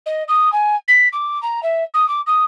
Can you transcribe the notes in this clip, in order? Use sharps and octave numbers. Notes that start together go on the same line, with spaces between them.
D#5
D#6
G#5
B6
D6
A#5
E5
D#6
D6
D#6